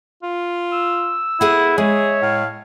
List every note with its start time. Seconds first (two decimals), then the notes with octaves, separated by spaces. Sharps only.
0.23 F4
0.72 E6
1.41 B3 E4 G#4 F#5
1.78 G#3 G#4 C#5 E5
2.22 A2 F5